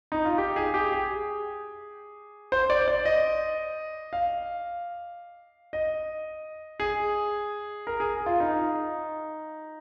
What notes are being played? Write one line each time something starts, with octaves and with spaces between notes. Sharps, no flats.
D#4
F4
G4
G#4
G4
G#4
C5
D5
D5
D#5
F5
D#5
G#4
A#4
G#4
F4
D#4